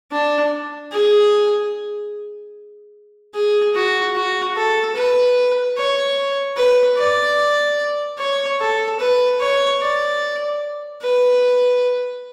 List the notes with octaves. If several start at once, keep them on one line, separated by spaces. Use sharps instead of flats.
D4
G#4
G#4
F#4
F#4
A4
B4
C#5
B4
D5
C#5
A4
B4
C#5
D5
B4